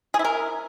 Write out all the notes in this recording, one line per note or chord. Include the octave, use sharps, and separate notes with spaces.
G#4
E4
A#4